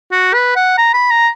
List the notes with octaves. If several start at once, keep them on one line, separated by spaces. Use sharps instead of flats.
F#4
B4
F#5
A#5
B5
A#5